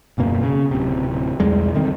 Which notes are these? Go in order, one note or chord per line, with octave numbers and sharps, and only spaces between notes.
D#1 F#2 B2 A#3
C#3
D1 C3
B1 E2 G3 G#3
D3 D#3 C4